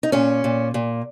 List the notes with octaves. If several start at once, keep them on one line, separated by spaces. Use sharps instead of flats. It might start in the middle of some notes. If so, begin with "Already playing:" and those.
D#4
A#2 C#4
A#2
A#2